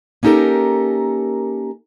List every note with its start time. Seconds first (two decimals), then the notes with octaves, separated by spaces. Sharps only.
0.23 A#3 C#4 D#4 G4 A4 A#4